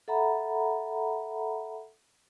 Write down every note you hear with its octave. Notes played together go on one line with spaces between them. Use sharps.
A4 E5 F#5 A#5 B5